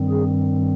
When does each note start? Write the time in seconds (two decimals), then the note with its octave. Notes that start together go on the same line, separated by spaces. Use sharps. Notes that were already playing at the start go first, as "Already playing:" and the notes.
Already playing: G2 D#3 G3 C4
0.09 G#4